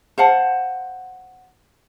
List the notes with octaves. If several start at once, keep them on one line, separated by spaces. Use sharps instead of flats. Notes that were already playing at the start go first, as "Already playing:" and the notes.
C5 F5 F#5 A5